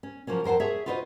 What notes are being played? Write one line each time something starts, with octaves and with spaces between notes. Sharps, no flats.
C#4
F3 F#3 A#3 C#4
F2 A#4 C5 F#5 A5
G#4 C#5 E5
F4 F#4 B4 C5 D5 D#5